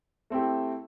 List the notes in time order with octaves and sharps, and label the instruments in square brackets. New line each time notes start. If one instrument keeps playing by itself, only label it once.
[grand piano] A3 C4 E4 G4